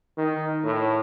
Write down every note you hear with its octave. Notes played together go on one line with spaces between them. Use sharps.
D#3
A2